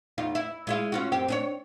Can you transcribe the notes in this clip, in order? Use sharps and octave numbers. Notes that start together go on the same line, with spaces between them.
E2 D#4 F4
E4
G#3 E4 F4
C#4 F4 F#4
F#2 C4 G4
D4 G#4 C#5